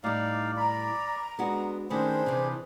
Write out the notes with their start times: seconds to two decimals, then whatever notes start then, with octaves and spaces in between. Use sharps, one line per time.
0.04 A2 G3 D#4 D5 F5
0.57 D5 A#5 B5
1.39 G#3 B3 D4 F#4
1.90 D#3 A3 C#4 D4 G#4 C5 B5
2.26 C3 E3